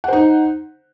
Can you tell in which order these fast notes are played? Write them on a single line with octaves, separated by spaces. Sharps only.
F#5 C5 D#4